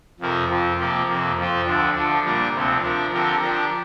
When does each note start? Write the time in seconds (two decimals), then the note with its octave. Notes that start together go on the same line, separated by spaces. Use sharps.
0.20 F2 C3 F3 C4 A#4
0.49 F2 F3 C4
0.78 C3 F3 A#3 G4
1.09 F2 C3 A#3
1.37 F2 F3 C4 F4
1.66 D2 D3 F3 D4
1.96 D3 F3 D4
2.25 A#2 G3 D4 A#4
2.54 D2 C3 F3 C4
2.83 F3 D4 A#4
3.13 D3 F3 C4 G4 A#4
3.42 F3 D4 G4 A#4